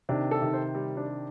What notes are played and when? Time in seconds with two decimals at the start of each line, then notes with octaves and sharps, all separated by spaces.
0.09 C3 D#3 D4
0.31 A4
0.42 C3 D#3
0.53 C5
0.75 G3
0.97 D4